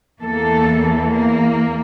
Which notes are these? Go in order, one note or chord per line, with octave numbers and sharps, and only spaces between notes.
E2 E3 A#3 A4
A#3